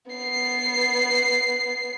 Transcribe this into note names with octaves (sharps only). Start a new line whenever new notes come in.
B3 C7